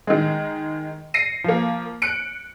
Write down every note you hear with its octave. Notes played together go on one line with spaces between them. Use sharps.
D#3 G#3
A#6 C7 C#7 D#7
F3 A#3
F#6 C#7 D7